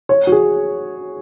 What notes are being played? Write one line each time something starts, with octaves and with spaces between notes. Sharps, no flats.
C#5
F#4
G#4